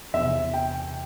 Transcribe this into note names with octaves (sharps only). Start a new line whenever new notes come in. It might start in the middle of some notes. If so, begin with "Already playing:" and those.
E2 C3 E3 E5
G5